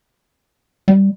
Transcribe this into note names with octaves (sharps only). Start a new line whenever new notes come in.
G3